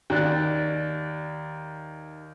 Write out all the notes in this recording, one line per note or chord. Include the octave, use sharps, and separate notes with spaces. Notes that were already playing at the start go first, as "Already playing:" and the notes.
D#2 D5 F#6